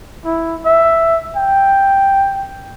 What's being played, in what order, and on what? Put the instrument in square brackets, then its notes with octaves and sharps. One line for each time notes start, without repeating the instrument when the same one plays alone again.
[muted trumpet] E4
E5
G5